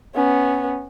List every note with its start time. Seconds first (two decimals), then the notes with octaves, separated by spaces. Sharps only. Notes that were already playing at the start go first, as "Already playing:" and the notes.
0.15 B3 C#4